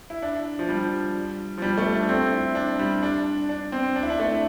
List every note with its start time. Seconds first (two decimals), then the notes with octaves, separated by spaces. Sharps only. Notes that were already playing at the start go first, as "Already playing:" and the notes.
0.10 E4
0.22 D4
0.59 F3
0.69 G3
1.58 F3
1.62 G3
1.77 A3
1.93 D4
2.09 C4
2.32 E4
2.55 D4
2.79 G3
3.03 D4
3.49 D4
3.72 C4
3.96 D4
4.03 E4
4.10 D4
4.19 A3